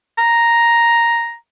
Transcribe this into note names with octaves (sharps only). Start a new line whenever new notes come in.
A#5